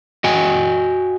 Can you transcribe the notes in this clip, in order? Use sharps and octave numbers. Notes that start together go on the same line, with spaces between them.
F#4 D#5 G5 G#5